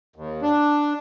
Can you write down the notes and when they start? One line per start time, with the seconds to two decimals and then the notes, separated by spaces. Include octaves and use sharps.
0.16 D#2
0.42 D4